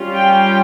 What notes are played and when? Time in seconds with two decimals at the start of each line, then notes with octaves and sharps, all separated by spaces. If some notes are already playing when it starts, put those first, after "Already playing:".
Already playing: G3 C#4 F4
0.13 G5